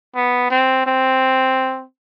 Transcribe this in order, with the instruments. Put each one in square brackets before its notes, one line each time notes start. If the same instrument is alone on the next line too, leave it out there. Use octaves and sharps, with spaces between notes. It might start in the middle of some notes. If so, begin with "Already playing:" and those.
[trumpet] B3
C4
C4